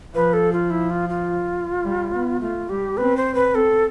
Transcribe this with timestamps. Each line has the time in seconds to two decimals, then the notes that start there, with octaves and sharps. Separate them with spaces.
0.14 F3 B4
0.33 A4
0.53 F4
0.70 E4
0.90 F4
1.09 F4
1.85 G3
2.13 B3
2.41 A3 F4
2.69 G3 G4
2.97 C4 B4
3.17 C5
3.35 B4
3.54 C4 A4